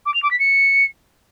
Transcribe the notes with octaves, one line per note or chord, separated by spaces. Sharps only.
D6
F7
D6
B6
C#7